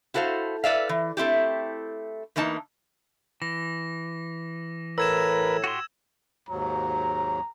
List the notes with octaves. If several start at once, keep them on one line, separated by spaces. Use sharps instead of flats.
E4 F#4 A4 C5 F5
A4 B4 D5 E5 F5
E3
A3 C4 E4 G4
E2 E3 A#3 D#4 A5
E3 A#6
A2 A#4 B4 E6 G#6 E7
F#4 G4 C6
D#2 G#2 F#3 A#5